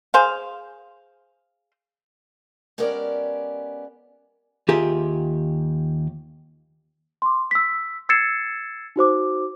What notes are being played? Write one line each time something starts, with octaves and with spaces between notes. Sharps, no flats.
G#4 C5 F5
G#3 B3 C#4 G4 A#4 D5
D#2 F4 G4 G#4 A#4 E5
C6 D6
E6 B6
E6 G#6 A6 C7 C#7 E7
D#4 F#4 C5 D6